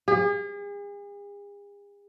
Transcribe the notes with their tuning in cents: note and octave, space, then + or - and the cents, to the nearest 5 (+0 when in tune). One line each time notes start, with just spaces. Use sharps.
G#4 -40